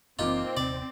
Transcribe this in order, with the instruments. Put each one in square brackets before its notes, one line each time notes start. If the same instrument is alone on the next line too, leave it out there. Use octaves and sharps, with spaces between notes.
[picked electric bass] F#1 E3 [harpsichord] A#2 F4 [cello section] C4 [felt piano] D#4 D6
[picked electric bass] D#1 C3 [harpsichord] D5